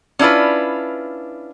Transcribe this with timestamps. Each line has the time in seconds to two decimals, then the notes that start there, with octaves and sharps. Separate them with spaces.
0.19 C#4 D4 E4 F4 B4